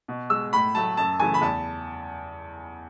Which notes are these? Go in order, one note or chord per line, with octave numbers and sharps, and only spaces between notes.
B2
G#3 E6
A2 B5
F#3 A3 A5
F#2 A5
C#3 E3 A3 G#5
B5
E2 A5